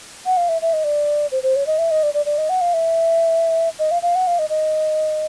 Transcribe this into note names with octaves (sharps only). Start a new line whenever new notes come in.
F#5
F5
E5
E5
D#5
D5
C5
C5
C#5
D#5
E5
D#5
D5
D5
D5
D#5
F#5
F5
E5
D#5
F5
F5
F#5
F5
D#5
D#5